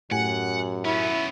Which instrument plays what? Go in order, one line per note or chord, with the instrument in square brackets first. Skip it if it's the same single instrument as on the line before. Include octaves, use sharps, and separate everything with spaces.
[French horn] F#2 [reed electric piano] A2 G4 G#5 [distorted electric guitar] F#5
[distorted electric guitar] B3 C#4 [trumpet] E4